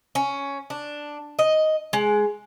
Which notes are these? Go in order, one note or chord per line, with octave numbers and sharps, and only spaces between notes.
C#4
D4
D#5
G#3